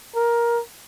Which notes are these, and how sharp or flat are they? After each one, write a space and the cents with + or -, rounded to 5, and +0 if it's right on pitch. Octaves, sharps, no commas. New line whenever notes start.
A#4 +15